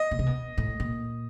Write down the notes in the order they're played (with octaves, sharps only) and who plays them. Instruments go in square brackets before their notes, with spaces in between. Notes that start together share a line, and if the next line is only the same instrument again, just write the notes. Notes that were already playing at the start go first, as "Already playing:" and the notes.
Already playing: [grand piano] D#5
[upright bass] B2
C3
B2
A2
A#2